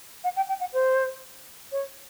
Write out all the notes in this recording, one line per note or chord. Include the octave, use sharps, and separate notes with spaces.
F#5
G5
G5
F#5
C5
C#5